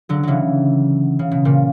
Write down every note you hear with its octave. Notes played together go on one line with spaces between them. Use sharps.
D3 F#3
C#3 E3 F#3
C#3
B2
A#2 C#3